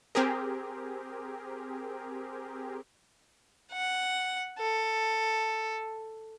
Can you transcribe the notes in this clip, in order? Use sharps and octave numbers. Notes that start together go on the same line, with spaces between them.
C4 G4 G#4 A#4
F#5
A4